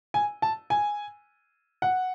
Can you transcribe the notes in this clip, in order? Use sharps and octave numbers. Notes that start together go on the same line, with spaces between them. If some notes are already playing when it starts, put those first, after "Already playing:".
G#5
A5
G#5
F#5